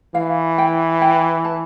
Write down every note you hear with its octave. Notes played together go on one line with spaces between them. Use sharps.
E3 F5
G5
G5
A5